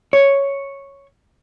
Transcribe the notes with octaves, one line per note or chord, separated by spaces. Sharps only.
C#5